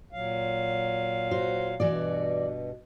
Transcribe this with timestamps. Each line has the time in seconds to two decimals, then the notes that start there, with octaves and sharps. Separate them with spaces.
0.12 A#2 F#3 F5
1.31 F#4 C5
1.80 G2 B2 E3 F#4 D5